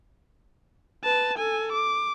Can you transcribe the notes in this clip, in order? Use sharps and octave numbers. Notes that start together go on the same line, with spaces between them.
B4 A5
A4 G#5
D6